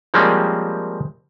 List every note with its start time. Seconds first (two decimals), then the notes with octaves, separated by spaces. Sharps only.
0.14 F3 G3 G#3 A#3 C4 C#4